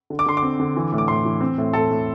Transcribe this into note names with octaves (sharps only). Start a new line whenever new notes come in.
D3
D6
D3 C6
D6
C4
D3
E3
A2
D6
A2 C6
E3
C4
A2
A2 A4
A2